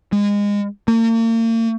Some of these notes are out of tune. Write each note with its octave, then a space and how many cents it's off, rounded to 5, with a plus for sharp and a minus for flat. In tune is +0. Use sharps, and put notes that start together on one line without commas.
G#3 -25
A#3 -45